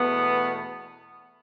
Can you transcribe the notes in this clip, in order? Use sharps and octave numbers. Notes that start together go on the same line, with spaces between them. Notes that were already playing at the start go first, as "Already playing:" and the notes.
Already playing: E2 B2 A3 B3